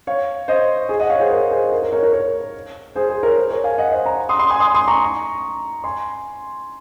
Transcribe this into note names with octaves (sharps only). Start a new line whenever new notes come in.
C#5 F5
C5 D#5
G#4
D#5 F#5
C#5 F5
G#4 C5
A#4 C#5
G#4 C5
A#4
A#4
A#4 C#5
A#4 C#5
A#4 C#5
G#4 C5
G#4 C5
A#4 C#5
G#4 C5
A#4 C#5
F5 G#5
D#5 F#5
C5 D#5
F#5 A#5
C6 D#6
C6 D#6
G#5 C6
C6 D#6
C6 D#6
A#5 C#6
G#5 C6